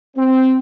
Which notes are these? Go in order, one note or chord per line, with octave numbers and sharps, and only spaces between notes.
C4